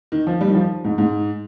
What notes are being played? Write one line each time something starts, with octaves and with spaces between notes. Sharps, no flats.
D#3
F3
G3
D#3
F3
G#2
G#2